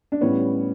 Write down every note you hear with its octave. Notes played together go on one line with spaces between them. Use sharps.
D4
A2 E3 G3 B3 C#4